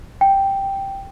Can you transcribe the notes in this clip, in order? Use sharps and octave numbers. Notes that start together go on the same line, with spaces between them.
G5